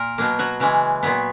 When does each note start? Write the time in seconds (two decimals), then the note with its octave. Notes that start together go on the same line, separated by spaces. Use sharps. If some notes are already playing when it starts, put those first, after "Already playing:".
Already playing: A#2 A#4
0.18 B2 F#3 A#3
0.39 F#3 F#4
0.60 C#3 E3 G#3
1.03 A#2 F#3 B3